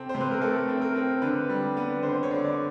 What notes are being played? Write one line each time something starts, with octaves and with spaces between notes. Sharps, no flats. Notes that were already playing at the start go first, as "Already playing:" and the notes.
Already playing: C3 C4 A4
C5
C3
B4
A#4
A3 A4
C4
A#4
C4
D3 B4
G3
B3
D3 C5
C#5
D3
D5